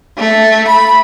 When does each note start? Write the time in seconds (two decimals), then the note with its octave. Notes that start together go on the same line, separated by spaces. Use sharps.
0.18 A3
0.68 B5